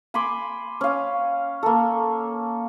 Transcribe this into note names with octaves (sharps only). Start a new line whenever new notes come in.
G#5 B5 C6 D6
C#4 F5
A#3 A4